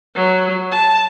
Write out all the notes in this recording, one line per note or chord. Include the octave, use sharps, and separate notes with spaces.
F#3
A5